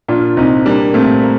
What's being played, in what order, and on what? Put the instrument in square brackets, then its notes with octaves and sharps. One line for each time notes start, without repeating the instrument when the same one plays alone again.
[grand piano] A#2 [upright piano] D4 F4
[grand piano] C2 [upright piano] C4 D#4
[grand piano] G3 [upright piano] A#3 D4
[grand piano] A#2 [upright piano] A3 C4
[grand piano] A#3